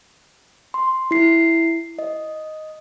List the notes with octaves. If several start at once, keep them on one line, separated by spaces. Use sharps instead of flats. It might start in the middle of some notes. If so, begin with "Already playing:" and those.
C6
E4 C7
D#5